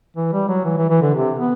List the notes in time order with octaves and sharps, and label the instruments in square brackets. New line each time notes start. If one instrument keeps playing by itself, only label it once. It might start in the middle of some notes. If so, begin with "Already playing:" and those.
[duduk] E3
G3
F#3
E3
E3
E3
D3
C3
B3